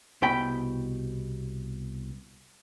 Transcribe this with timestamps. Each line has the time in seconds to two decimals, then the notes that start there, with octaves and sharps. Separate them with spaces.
0.22 C2 B2 G5 B5